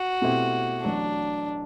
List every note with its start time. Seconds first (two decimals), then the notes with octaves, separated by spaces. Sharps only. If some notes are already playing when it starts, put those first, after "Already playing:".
Already playing: F#4
0.22 B2 A3 C4 E4 G4
0.83 A1 A2 F#3 D4